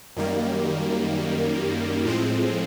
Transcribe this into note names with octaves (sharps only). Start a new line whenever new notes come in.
F#2 D#3 G3 A#3
A2 F3 G#3 C4